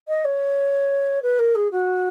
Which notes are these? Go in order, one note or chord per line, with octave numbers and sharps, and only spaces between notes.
D#5
C#5
B4
A#4
G#4
F#4